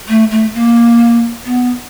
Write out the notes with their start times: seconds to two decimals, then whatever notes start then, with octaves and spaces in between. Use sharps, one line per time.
0.09 A3
0.31 A3
0.54 A#3
1.45 B3